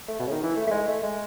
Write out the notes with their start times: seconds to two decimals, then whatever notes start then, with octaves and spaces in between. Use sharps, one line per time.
0.08 A3
0.19 B2
0.27 C#3
0.31 D#3
0.43 E3
0.56 A3
0.67 A3
0.71 G#3
0.88 A3
1.03 G#3